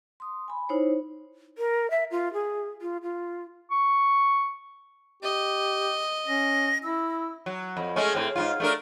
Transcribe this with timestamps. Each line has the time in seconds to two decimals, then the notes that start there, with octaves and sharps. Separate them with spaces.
0.20 C6 D#6
0.48 G#5 B5
0.69 D#4 E4 C5 C#5
1.58 A#4
1.91 E5
2.11 F4
2.33 G#4
2.81 F4
3.03 F4
3.71 C#6
5.23 G4 D#5
6.28 C#4 A#6
6.83 E4 E6
7.46 F#3
7.77 F2
7.96 G#3 A3 C#4
8.15 A2 C4
8.36 G#2 B2 F4
8.60 A3 D4 A#4